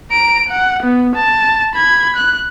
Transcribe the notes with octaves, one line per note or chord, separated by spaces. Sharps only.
A#5 D7
F#5
B3
A5
B5 G#6
F#6